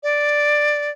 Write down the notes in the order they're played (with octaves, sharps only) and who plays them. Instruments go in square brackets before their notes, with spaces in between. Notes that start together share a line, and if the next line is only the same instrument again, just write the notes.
[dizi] D5